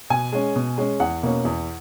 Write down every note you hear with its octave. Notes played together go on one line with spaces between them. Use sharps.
B2 G#5
G#3 C#4
B2
G#3 C#4
E2 F#5
B2 A#3 C#4
E2